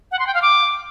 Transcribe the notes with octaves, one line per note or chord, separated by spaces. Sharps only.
F#5
C6
G5
F5
D6